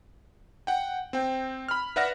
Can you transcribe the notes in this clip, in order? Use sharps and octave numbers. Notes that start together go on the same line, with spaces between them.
F#5 G5
C4 G5
B5 F6
B4 D5 E5 F#5 F6 A#6